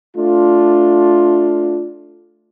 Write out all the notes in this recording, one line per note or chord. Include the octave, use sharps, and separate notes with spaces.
A3 D4 F4